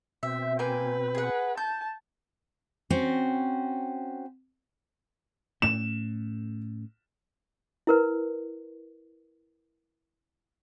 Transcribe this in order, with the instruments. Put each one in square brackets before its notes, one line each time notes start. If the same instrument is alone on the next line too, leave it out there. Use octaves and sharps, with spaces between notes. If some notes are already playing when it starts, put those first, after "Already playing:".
[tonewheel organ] B2 C4 [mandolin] E5
[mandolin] A#3 G5 G#5 [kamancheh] B4
[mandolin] G#4 F#5
[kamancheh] A5 [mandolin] G6
[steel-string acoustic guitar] C4 C#4 F#4
[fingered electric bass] A2 A3 C#4 [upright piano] E7
[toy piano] E4 A#4 B4